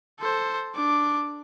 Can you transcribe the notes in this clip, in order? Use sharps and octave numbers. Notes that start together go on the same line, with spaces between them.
A4 C5
D4 D6